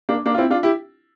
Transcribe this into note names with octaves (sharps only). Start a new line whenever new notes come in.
A#3 D4
A#3 D4
F4
C4 E4
D4 F4
E4 G4